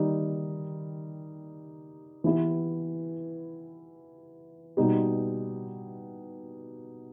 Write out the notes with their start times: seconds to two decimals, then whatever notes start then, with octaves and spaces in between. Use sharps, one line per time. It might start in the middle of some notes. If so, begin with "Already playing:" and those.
Already playing: D#3 G3 D#4
2.24 E3 B3 E4 G4
4.77 B2 G3 D#4 G4